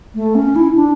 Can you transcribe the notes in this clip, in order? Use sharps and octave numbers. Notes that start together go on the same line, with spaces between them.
A3
C#4
E4
D4